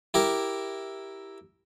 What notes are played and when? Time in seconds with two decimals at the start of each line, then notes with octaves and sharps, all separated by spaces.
0.14 E4 G4 A#4